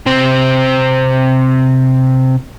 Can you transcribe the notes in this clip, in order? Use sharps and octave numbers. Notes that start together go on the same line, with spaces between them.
C3 C4